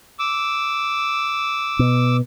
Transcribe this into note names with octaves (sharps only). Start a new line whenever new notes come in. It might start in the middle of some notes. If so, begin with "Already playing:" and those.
D6 E6
B2